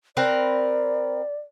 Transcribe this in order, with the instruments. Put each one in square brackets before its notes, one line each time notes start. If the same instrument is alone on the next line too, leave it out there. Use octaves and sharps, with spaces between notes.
[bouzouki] C4 A#4 B4 [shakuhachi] D5